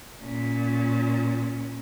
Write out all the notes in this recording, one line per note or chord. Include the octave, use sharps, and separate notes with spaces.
A#2 C#4